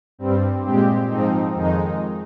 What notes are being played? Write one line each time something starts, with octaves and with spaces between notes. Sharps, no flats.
G2 G3 C4
A#2 G#3 C4 G4
G#2 F3 C4 D#4
F2 D#3 G#3 D#4